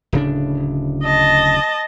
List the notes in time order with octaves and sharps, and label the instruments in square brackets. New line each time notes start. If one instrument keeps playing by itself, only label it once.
[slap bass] D1 C#3 D4
[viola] D#5 A5